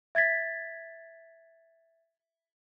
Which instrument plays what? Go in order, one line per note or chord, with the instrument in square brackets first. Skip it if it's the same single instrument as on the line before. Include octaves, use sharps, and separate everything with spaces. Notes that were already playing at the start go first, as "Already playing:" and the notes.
[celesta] E5 G#6 A6 B6